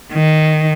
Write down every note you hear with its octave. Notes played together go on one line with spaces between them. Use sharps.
D#3